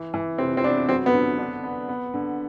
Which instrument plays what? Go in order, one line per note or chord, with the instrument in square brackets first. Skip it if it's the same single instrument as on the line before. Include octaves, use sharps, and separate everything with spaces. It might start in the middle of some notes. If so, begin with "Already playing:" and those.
Already playing: [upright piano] E3
E3
[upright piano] C3 [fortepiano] C4
[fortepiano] C4
[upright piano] B3 [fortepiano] D4
[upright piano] F#3 [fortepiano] C4
[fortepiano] B3
[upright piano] D3
D4
B3
B3
D3